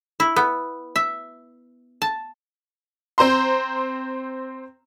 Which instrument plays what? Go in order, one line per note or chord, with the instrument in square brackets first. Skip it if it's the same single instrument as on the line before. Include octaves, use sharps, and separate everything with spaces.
[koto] E4
B3
E5
A5
[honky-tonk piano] C4 C5 A#5 C6